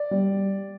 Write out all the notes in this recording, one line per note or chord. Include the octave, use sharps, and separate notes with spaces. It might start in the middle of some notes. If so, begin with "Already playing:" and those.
Already playing: D5
G3